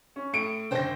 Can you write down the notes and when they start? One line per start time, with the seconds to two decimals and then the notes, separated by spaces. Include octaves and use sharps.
0.16 C#4
0.33 A2 C#7 D7
0.71 F#1 D3 C5 G5 A#6